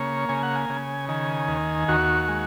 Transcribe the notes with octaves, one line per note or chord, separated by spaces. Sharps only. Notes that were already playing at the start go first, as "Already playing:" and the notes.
Already playing: C#3 A#3 C#5
C#3 G#5
F#5
G#5
C#3
D#3 G#5
D#2
D#2 F#4
G#3